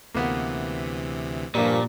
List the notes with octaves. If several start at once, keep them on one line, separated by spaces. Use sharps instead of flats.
D2 C3 E3 A#3 B3
G2 A#2 F3 G3 A#3 D4 C#6 B6